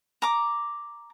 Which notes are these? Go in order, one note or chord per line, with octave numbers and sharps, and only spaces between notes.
A#5 D6